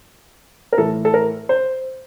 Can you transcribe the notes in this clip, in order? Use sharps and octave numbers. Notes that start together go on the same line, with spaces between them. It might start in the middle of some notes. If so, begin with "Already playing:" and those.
A#4
A2 E3 A4
A4
A#4
C5